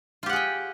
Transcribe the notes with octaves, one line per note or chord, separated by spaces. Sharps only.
F4 G4 G#4 F#5 G5